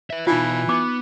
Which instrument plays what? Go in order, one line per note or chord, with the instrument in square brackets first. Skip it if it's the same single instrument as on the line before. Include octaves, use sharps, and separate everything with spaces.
[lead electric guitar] B4 E5
[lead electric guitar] B2 F5 [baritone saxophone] E3 [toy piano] D#4 F4
[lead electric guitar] B3 [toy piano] D6